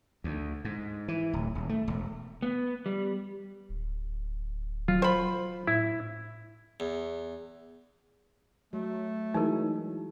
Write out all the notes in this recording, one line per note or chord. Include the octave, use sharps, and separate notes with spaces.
D2
G#2
E3
D1
D#1
A3
E1
B3
G3
D1
F#3 F4
C5 B5
A2 E4
E2
F#3 A3
E3 F#3 G#3 D#4 A#4